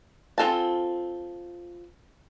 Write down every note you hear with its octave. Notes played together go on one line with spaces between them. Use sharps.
C4 F4 A4 G#5 A5